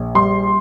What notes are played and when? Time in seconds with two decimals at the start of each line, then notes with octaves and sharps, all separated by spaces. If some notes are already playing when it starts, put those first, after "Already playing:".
Already playing: A#1
0.15 G3 C6